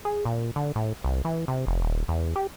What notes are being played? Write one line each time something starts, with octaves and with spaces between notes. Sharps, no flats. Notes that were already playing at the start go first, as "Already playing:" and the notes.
G#4
A#2
D3
A2
C2
E3
C3
F1
D#1
E2
G4